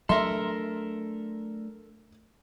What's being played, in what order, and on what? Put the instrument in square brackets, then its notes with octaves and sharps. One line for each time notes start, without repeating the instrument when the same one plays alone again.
[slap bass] F#3 A3 D4 [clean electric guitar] A4 A#4 [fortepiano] E5 C6